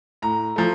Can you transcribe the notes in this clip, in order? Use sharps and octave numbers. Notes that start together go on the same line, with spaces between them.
A2 A#5
F3 A3